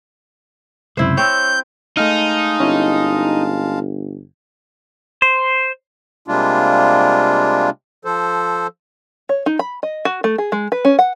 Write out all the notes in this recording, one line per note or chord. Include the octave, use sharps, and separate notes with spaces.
C#2 F#2 C3 E4 C5
C4 C#5 G6
G#3 A3 D#4 F5 A5 F6
G1 C#4 E4
C5
C3 G3 G#3 A#3 D4 F4
F3 A4 C5
C#5
D#4
B5
D#5
F#4
A3
G#4
G#3
B4
C#4
F#5